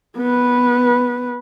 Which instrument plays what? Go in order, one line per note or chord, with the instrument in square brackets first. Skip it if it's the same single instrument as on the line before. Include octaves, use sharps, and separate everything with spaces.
[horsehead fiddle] B3 B4